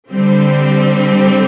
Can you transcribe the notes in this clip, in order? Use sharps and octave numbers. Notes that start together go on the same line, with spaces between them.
D3 G3 C4